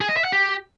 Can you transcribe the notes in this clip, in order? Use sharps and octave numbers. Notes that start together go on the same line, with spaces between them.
G#4
D#5
E5
F#5
G4